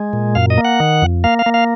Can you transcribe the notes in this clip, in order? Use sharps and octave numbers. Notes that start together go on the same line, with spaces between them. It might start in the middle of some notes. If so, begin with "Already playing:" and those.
Already playing: G#3
A#2
F#2 F5
D#5
A#3
F#5
D#3
F2
A#3 F5
F5
A#3
F5